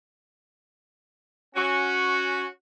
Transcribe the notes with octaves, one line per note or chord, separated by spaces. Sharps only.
C#4 F#4